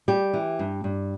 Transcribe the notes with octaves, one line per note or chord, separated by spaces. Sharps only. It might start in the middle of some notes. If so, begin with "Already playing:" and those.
G3 G4
E3
G2
G2